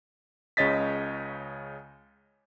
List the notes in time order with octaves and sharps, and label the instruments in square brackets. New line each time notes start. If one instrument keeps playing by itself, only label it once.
[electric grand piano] C#2 C#3 C#5 D#5 A6 B6